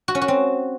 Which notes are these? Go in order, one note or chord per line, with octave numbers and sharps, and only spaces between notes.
F#4
C#4
F#4
C4